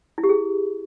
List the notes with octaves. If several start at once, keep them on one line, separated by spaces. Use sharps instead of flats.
E4
G4
G#4